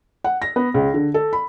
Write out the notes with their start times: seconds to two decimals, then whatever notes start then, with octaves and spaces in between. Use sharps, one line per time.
0.24 F#5
0.42 A#6
0.56 B3
0.74 C#2
0.94 D3
1.14 A4
1.33 B5